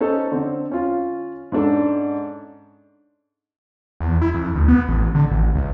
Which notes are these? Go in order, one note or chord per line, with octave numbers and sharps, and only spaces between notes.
C#4 D#4 A4 C5
D3 C4
C#4 F4
G#2 C#4 D4 A4
E2
E4
F2
D2
B3
A1
D3
A1
C#2